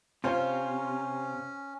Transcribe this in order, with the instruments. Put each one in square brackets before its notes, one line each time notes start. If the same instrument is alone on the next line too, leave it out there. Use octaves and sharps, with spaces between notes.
[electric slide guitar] C3 [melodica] C#4 [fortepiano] F4 C5 C#5